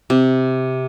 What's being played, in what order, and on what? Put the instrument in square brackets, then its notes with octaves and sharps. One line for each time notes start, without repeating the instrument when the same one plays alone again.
[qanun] C3